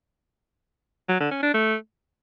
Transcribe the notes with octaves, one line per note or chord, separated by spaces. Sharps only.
F#3
D3
C#4
D4
A3